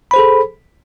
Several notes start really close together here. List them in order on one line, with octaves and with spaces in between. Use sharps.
B5 C5 G#4 A4